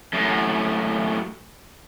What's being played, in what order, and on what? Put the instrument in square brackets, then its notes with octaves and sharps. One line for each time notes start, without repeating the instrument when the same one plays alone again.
[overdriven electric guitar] F#2 A2